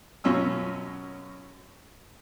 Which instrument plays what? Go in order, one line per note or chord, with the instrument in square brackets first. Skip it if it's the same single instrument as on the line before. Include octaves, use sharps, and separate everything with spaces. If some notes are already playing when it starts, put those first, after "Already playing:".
[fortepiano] F#2 B2 C#4 F4 E6